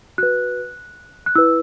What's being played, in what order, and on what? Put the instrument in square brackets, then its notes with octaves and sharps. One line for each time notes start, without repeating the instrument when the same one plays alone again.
[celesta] F#4 B4 F#6
F#6
E4 B4 E6